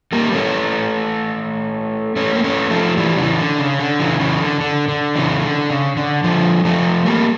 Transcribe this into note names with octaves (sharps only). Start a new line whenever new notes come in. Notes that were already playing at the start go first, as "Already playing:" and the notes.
G3 A#3
A3 C#4
A3 C#4
A#3
A3 C#4
F3 A3
E3 G3
C#3 E3
D3
C#3
D3
C#3 E3
C#3 E3
D3
D3
D3
C#3 E3
D3
C#3
D3
D3 F3
F3 A3
G3 A#3